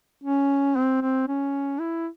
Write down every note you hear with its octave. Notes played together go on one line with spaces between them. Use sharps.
C#4
C4
C4
C#4
E4